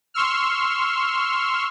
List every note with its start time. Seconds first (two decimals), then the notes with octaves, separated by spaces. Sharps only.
0.14 C6 C#6 E6 F6